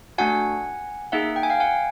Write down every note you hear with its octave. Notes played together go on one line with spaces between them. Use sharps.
A3 D4 F#4 F#5 G#5
A#3 D#4 G#4 E5 F#5
G5
G#5
F5 G5
F#5 G#5